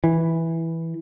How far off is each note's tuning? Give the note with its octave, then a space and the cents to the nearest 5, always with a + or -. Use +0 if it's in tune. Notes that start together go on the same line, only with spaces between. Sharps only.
E3 -5